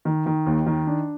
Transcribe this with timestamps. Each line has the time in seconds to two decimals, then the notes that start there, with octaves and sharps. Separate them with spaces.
0.05 D#3
0.26 D#3
0.46 D#2
0.66 D#3
0.87 D4